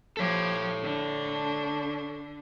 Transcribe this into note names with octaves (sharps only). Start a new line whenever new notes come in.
F3 G4 A4 C#5 G#6
D3 D4